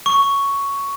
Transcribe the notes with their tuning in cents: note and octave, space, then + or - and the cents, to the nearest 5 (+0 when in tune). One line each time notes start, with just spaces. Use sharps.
C#6 +5